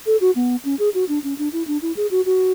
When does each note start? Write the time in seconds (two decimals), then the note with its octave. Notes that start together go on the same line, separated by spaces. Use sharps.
0.06 A4
0.21 F#4
0.36 B3
0.65 C#4
0.79 G#4
0.94 F#4
1.09 D4
1.24 C#4
1.38 D4
1.53 E4
1.68 D4
1.82 E4
1.97 G#4
2.11 F#4
2.26 F#4